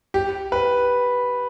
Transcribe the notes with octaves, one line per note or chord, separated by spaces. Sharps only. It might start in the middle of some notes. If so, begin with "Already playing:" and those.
G4
B4